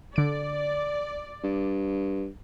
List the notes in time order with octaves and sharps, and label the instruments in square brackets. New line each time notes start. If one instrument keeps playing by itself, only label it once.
[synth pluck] D3 D7 [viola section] D5
[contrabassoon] G2